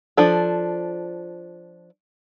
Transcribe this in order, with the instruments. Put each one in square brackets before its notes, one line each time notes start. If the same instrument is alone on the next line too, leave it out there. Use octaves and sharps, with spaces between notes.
[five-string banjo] F3 D4 A4